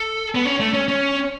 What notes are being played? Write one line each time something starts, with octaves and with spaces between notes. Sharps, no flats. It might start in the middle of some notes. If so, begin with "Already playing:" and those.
Already playing: A4
B3
C#4
A3
C#4
C#4